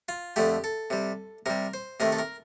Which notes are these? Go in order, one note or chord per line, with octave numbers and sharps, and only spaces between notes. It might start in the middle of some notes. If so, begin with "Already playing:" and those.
F4
F2 D3 A3 G4
A4
C3 G3
C3 G3 A#4
C5
C3 D#3 A3 A#4
A4
A#4